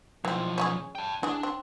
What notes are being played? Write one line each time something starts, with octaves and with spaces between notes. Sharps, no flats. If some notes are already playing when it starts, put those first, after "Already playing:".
B1 E3 F3 C4
C#4 F4 G#4
G5 A5
E3 D4 G#4
C4